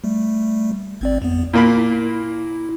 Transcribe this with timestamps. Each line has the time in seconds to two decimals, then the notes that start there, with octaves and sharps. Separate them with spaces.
0.04 G3 A3
1.01 G#1 C4 D5
1.22 F2 B3
1.53 A#2 A#3 E4 B5